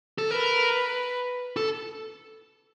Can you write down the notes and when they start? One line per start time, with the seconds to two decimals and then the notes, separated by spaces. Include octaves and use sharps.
0.18 A4
0.30 A#4 B4
1.57 A4